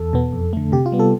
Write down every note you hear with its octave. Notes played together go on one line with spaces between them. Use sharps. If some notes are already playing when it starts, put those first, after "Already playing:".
Already playing: E2 A4
B2 B3
F2
D3 A3
C3 G4
F4
G3 B3
A4